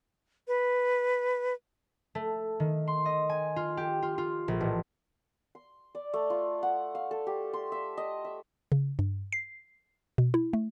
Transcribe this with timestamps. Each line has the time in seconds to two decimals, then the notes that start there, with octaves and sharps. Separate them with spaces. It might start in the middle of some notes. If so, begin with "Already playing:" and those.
0.48 B4
2.15 A3
2.60 D#3
2.88 C6
3.05 D#5
3.29 G#5
3.56 F4
3.77 G4
4.02 F4
4.18 F4
4.48 A#1
4.60 A1
5.55 C6
5.95 D5
6.14 A3
6.30 F4
6.63 F#5
6.95 F5
7.11 A4
7.27 G4
7.53 C6
7.72 E5
7.97 D#5
8.25 E5
8.72 C#3
8.99 G2
9.32 C7
10.18 B2
10.34 E4
10.53 A3